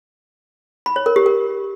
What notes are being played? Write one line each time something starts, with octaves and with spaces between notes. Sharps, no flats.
B5
C#5
A#4
G4
A#4